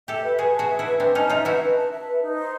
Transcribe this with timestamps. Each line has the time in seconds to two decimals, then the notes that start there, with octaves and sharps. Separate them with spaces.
0.08 G4 A4 E5
0.24 B4
0.38 F#4 G#4 B4
0.54 A5
0.59 F#4 G#4
0.69 E5
0.79 E4 F#4
0.85 B4
1.00 C4 D4 B4
1.15 C#4 D#4 A5
1.30 D#4 F4 E5
1.45 E4 F#4 B4
1.61 B4
1.76 A5
1.91 E5
2.06 B4
2.22 D#4
2.37 C5